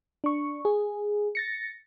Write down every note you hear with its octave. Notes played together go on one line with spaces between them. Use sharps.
D4 C#6
G#4
A6 A#6 C#7